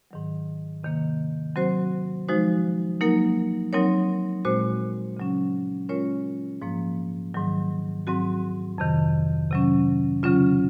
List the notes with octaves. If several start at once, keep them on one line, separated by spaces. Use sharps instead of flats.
G#2 D#3 F#3
C3 D#3 A#3
F#3 C4 F#4 C5
F3 G#3 D#4 F#4 C5
F#3 A#3 D#4 A#4
F#3 C4 D#4 A#4 C#5
A#2 G#3 C4 F#4 C5
C#3 F#3 C#4
G#3 C#4 F4 A#4 C#5
G#2 F3 A#3
G#2 D#3 F#3
G#2 F#3 C4 F#4
F2 C3 D#3
C3 F#3 C#4
C#3 F#3 C#4 F4